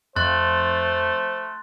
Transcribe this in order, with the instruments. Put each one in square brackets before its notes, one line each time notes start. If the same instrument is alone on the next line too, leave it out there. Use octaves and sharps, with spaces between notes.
[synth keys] F2 [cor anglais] A3 [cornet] C5 [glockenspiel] C6 F#6 A6